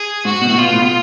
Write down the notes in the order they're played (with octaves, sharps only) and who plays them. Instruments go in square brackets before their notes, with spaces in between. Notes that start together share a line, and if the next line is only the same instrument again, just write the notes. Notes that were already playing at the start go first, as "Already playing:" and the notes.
Already playing: [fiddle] G#4
[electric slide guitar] G#2 [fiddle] F#4
[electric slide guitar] B2
A2
[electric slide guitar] B2 [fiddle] F4
[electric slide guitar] A2
B2